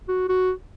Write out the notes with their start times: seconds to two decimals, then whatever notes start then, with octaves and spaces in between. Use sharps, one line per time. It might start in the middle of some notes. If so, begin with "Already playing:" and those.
0.09 F#4
0.29 F#4